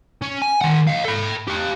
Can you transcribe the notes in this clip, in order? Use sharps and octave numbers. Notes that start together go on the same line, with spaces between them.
C#4
G#5
D#3 F#5
D#5 F5
A4 B5
G4 F5